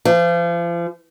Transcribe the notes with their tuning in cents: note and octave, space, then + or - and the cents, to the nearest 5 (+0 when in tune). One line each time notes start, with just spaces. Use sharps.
F3 -35